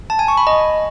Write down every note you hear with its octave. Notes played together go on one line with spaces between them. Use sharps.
A5
G#5
C#6
B5
D#5